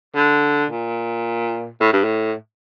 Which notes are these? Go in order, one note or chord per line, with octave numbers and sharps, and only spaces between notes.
D3
A#2
A2
G2
A2